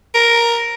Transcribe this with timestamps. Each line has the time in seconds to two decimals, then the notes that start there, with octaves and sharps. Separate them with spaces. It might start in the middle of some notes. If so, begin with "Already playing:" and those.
0.15 A#4